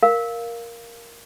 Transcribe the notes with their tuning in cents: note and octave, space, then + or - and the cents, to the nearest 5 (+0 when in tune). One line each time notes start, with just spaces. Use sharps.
A#4 +5 F5 +0